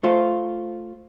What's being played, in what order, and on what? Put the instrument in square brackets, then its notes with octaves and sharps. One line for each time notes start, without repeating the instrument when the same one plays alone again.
[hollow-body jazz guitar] A3 F4 C5